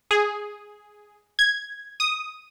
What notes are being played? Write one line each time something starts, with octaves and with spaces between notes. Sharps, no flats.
G#4
G#6
D#6